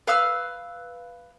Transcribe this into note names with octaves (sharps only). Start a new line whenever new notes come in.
B4 F5 E6 F6